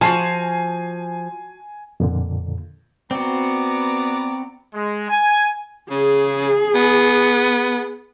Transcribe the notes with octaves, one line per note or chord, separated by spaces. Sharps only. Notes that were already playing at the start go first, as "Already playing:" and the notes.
F3 F#4 G#5 A5 C7
F2 A#2 D3
B3 C4 F#4 D5 A#5
G#3
G#5
C#3 G#4
B3